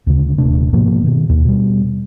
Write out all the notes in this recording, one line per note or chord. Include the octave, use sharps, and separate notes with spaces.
D2 C#3
D#1 C3 A3 D4
G#2 B2 F3 A#3
B2 D#3
D#2
B2 G3